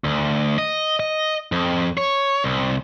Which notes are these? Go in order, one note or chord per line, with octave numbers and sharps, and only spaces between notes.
D2
D#5
D#5
F2
C#5
C2